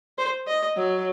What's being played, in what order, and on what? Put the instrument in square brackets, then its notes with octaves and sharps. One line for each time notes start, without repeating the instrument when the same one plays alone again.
[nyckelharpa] C5
D#5
[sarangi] F#3